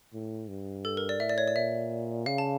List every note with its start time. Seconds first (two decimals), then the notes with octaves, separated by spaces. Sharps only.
0.14 A2
0.49 G2
0.85 A4
0.97 A#4
1.09 D5
1.20 A2 E5
1.29 D5
1.38 C#5
1.48 D5
1.56 A#2 E5
2.26 C#3 F5
2.38 A5